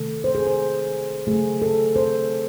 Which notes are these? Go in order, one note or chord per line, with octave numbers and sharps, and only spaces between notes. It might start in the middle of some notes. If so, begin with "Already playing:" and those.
Already playing: C3 D#3 A3 A4
C5
G#4
C5
C#3 F#3 A3 G#4
A4
C5